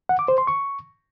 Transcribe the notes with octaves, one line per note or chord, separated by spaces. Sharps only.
F#5
D6
C5
C6
C#6